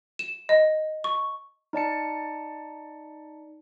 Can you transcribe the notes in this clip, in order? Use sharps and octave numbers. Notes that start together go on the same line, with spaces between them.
E7
D#5
C#6
D#4 D5 A5 C#7